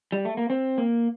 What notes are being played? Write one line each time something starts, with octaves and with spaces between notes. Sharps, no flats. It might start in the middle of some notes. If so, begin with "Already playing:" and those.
G3
A3
A#3
C4
A#3